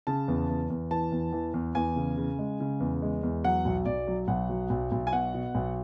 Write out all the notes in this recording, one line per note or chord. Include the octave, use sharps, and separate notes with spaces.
C#3 A5
E2
E2
E2
E3 A5
E2
E3
E2
E2 G#5
C#3
C#3
G#3
C#3
E2
G#3
E2
F#3 F#5
B1
B1 D5
F#3
B1 F#5
F#3
B1
B1
G#5
B2 F#5
B2
B1